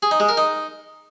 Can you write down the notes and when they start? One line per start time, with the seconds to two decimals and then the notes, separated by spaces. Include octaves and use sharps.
0.03 G#4
0.11 D#4
0.20 G#3
0.29 A#4
0.37 D#4